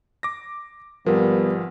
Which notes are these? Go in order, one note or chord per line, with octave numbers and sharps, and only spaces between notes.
D6 A#6
G#1 F3 G3 B3 A#4